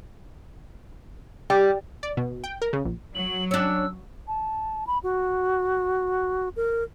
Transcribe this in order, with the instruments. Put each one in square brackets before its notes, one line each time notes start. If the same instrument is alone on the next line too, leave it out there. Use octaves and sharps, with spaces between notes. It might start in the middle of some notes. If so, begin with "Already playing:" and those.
[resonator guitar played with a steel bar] G3 [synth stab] G4
[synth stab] D5
B2
G5
A#4
C#3
A#1
[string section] F#3 [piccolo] F#7
[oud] C#4 D4 [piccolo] E6
[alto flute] A5
B5
F#4
A#4